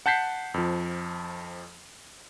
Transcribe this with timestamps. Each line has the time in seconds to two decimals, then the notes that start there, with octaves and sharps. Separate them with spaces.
0.06 F#5 A5 G6 B6 C7
0.54 F2 F3